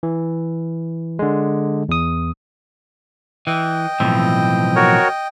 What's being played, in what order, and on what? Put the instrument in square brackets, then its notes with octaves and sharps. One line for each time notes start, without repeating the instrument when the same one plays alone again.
[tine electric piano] E3
D3 G#3
E2 D#6
[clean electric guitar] E3 [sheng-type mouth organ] D#5 G5
[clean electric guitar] B1 A2 [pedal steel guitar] E3 F3 C4
[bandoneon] F#4 A#4 C#5